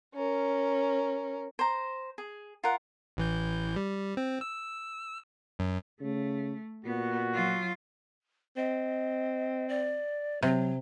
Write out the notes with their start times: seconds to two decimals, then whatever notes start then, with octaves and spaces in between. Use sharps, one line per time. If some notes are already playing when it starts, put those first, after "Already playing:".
0.13 C#4 A#4
1.59 C5 A#5
2.18 G#4
2.64 F4 A#4 F#5
3.17 A1 E3 G6
3.76 G3
4.17 C4
4.41 E6
5.59 F#2
6.01 C#3 A3
6.85 A#2 B3 F#4
7.34 F#3 F4
8.57 C4 D#5
9.69 D5
10.42 C3 F#3